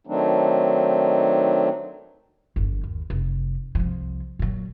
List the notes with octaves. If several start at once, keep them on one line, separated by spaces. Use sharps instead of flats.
D#3 F#3 A3 C4 D4 D#4
G1 E2
D#2
F1
C2 F3
A#2 F#3